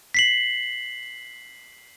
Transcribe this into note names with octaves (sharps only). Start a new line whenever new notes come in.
B6 C7 F#7